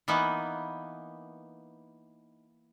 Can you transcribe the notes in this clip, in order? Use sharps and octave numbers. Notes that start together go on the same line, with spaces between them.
E3 A#3 B3 D#4